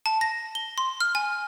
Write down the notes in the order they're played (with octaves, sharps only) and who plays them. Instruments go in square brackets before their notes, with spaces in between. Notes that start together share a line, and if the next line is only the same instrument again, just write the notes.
[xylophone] A5
A#6
G7
C6
F6
G#5